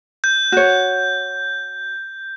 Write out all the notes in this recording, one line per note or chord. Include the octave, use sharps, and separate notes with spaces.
G6
F#4 C#5